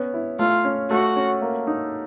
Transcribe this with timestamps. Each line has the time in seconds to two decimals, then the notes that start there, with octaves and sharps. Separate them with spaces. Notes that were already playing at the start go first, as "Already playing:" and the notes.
Already playing: B3 C#4
0.14 E4
0.39 A3 F4
0.65 C#4
0.90 A3 F#4
1.16 C#4
1.42 A#3
1.67 D#4